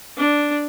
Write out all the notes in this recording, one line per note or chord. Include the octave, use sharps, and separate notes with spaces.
D4